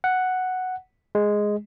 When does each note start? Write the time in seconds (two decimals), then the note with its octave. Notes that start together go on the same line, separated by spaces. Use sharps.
0.04 F#5
1.15 G#3